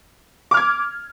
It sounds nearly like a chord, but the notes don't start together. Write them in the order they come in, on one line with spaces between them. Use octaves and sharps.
D6 F6 G#6